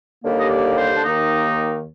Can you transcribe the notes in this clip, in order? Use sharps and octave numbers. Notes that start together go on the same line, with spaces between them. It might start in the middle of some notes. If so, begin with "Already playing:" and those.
D#2 D3 G3 A#3
D#5
D5
C5
D4
D#2 D#3 A#3 D#4